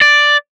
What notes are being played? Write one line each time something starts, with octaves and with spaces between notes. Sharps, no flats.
D5